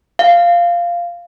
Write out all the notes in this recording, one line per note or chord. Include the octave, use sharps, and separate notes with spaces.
F5